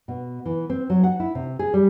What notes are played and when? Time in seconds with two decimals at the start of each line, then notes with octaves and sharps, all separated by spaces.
0.08 B2
0.46 E3
0.70 C4
0.90 F#3
1.03 F#5
1.20 E4
1.35 C3
1.59 G#4
1.74 G3